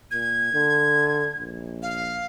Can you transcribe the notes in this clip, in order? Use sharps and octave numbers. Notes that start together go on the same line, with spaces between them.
A#2 G#6
D3
A#1
F5